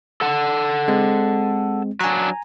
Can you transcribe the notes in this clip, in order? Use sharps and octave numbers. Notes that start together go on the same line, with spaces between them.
A4 F#5 A5
G#3 C4
F#3 D4 G#5 A#5